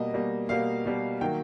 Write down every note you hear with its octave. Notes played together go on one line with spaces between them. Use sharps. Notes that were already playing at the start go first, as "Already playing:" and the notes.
Already playing: B2 G3 A#3 D#5
B2 G3 A#3
B2 G3 A#3 F5
B2 G3 A#3
D#3 F#3 A#3 G5